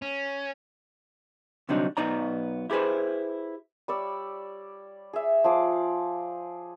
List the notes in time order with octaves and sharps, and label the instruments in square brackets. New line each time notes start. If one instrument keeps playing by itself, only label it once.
[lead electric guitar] C#4
[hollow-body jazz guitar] D2 C3 F#3 G3 D4 D#4
B1 B3 D#4 D5 A#5
E4 G4 G#4 B4 C5
[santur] G3 C#5 D5 E6
G#4 E5
F3 G#4 D6